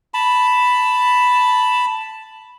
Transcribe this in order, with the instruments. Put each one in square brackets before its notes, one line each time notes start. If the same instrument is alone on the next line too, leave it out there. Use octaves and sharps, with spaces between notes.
[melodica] A5 B5